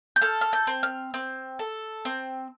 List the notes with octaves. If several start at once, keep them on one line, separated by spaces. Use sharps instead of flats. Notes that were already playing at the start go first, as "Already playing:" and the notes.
G6
A4 F6
F6
G6
C4
F6
C4
A4
C4